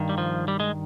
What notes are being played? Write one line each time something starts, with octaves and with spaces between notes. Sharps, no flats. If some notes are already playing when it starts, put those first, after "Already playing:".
Already playing: G2 D#3
G3
F3
G3
G#3